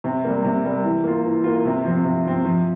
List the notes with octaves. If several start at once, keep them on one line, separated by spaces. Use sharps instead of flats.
C3
G3 A#3
C3
G3 A#3
E3
A#3 F4
E3
A#3 F4
C3
F3 C4
C3
F3 C4
F3